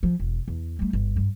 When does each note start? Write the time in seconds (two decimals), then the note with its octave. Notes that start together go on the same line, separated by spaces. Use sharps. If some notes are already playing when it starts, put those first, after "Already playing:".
0.03 F3
0.19 E1
0.48 E2
0.79 G3 A3
0.93 G1
1.16 G2